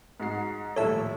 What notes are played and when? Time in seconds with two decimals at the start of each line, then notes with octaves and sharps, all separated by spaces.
0.20 G#2 F#4 C7
0.76 D#1 A#1 A2 A4 C#5 E5 A5